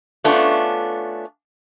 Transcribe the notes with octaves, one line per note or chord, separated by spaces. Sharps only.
A3 B3 C#4 D4 F4